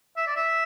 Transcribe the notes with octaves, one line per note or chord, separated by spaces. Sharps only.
E5
D5
E5